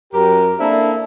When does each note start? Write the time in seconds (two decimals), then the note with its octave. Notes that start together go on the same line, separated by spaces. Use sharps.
0.13 F#2 G4 A#4
0.59 A#3 C4 D4 E4 A4 E5